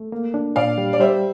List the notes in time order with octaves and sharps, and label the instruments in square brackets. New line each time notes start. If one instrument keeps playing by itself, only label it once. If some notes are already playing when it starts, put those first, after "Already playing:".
Already playing: [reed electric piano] A3
A#3
D4
[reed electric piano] A#2 [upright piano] D5 F5
[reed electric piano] G3
[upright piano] D5
[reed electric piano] G3 [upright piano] C5 E5